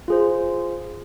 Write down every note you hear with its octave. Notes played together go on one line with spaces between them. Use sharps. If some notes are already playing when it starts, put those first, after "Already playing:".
F4 G#4 C5